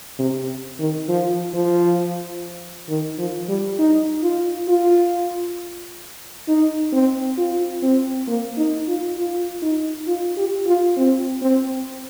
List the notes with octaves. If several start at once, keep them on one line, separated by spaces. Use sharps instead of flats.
C3
D#3
F3
F3
D#3
F3
G3
D#4
F4
F4
D#4
C4
F4
C4
A#3
D#4
F4
F4
D#4
F4
G4
F4
C4
C4